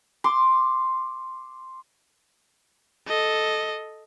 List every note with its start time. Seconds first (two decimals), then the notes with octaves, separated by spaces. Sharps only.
0.24 C6 D6
3.07 A4 D#5